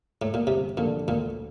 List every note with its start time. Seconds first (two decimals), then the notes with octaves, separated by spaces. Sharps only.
0.22 A2
0.34 A#2
0.46 G1 C3
0.77 F2 A#2 D3 A3 D4
1.08 D2 A#2